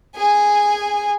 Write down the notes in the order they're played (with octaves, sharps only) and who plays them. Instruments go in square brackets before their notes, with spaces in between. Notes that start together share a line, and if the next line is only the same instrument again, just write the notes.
[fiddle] G#4 G#5